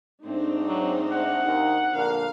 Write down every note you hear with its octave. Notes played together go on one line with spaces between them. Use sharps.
G#2 A3 C4 D4 D#4
F#3
F#5
D#2 D#3
A#1 D3 A#4 F5